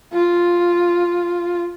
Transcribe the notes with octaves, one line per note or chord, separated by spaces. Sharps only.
F4